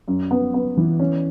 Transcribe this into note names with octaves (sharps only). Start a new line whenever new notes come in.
F#2
B3
B3
E3
C#4